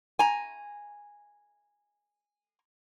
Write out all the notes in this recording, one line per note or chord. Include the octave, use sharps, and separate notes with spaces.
G#5 A#5